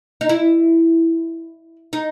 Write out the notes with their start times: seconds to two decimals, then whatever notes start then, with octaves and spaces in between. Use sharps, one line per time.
0.21 D#4
0.29 E4
1.93 D#4